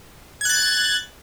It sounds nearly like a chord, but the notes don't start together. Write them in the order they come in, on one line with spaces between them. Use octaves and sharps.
G#6 F#6 A6